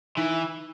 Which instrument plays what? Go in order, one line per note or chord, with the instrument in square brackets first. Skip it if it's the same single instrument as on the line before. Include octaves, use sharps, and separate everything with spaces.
[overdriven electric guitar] E3 [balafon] D#4